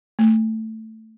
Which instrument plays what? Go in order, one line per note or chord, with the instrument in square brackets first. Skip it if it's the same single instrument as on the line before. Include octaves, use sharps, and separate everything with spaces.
[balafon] A3